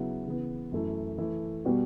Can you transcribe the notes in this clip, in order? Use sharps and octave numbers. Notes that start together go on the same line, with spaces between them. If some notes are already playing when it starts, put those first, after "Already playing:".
Already playing: C#3 F#3 B3 E4
C#3 E3 B3
F#2 E3 A3 E4
E3 A3 E4
B2 G3 B3 F#4